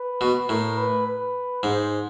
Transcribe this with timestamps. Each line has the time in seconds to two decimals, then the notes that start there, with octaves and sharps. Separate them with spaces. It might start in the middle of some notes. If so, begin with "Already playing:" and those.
Already playing: B4
0.21 B2
0.49 A2 A#4
0.78 B4
1.07 B4
1.63 G#2 C5